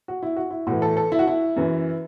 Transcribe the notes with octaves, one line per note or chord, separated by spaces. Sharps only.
F#4
E4
F#4
E4
A2 F#4
E3
A4
A4
E4
F#4
E4
F#2 E3